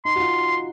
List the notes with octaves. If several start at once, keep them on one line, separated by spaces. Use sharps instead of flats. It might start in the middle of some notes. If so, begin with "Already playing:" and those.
D#4 C6
F#4
F4